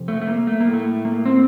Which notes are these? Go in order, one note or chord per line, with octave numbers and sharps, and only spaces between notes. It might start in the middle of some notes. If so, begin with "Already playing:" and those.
Already playing: F2 C3
A3
A3
A#3
A3
A#3
A2
A3
A#3
C4